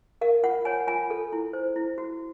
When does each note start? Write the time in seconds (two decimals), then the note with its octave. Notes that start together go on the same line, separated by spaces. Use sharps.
0.21 A#4 F5
0.43 F4 F#5
0.65 C#5 G#5
0.87 F4 G#5
1.10 A4
1.32 E4
1.53 C5
1.76 E4
1.98 F#4